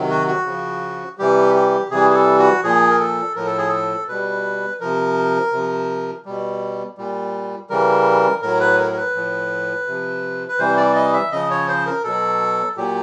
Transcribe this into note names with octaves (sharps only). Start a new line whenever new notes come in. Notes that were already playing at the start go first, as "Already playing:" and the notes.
Already playing: C3 D#3 F#3
F#4
F#4
C#3 F3
C3 E3 G3 G4
G4
C3 E3 G3 G#4
G#4
A4
F#4
A#2 F3 G#4
A#4
A4
A2 F3 A#4
A4
G#4
A4
B2 G3 B4
C3 F3 A#4
C3 F3
B2 G3
A#2 G3
C#3 E3 G3 A#4
A2 F#3 A#4
B4
A#4
A#4
B4
A2 F3
C3 F3
B4
C3 E3 G3 C5
D5
D#5
E5
C#3 F3 D#5
C#5
C5
A#4
B2 F#3 A4
A#2 F#3 G4